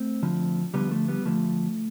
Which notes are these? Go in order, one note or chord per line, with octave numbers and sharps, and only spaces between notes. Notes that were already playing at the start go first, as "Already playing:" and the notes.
Already playing: A3 C4
D2 D3 F3
D2 D3 F3 G3 B3
A3
G3 B3
D2 D3 F3 A3